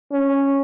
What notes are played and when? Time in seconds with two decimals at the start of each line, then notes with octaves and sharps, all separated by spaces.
0.12 C#4